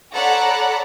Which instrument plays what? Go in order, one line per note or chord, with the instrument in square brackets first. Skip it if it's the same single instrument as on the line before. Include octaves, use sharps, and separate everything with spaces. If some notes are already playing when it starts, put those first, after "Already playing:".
[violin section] A4 C#5 D5 F#5 A#5 B5